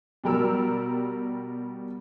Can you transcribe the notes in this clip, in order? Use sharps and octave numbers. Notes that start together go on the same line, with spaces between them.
B2 G3 A#4 E6